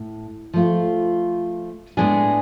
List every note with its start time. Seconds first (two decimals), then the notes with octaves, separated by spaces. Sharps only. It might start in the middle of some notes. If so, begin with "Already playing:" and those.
Already playing: A2
0.54 F3 A3 F4
1.97 A2 G#3 B3 D4 G#4